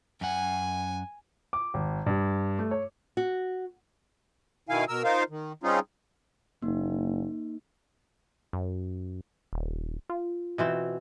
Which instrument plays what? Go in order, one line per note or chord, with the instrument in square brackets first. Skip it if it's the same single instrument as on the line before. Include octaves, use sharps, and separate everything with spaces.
[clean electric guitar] F#2 F#5 [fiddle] G#5
[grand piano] D6
G#1
G2
A3
C#5
[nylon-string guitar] F#4
[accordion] B2 D#3 E4 F5 G#5
B2 A#4 E6
D#4 F4 A#4 C5 F5
D#3
G3 C4 C#4 D#4 F4 G#4
[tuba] F#1 [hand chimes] A#3 D#4
[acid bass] F#2
D#1
F4
[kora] B2 E3 C4